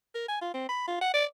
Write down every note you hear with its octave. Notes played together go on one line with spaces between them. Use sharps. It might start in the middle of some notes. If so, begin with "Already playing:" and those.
A#4
G#5
F4
C4
B5
F4
F#5
D5